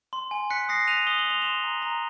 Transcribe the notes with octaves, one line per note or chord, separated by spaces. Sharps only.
C6
G#5
F#6 B6 C#7
D#6 A#6 C7
F#6 D#7 F7
D#6 G7
F#7
C6 F7
C6 E7 F#7
A#5
A#5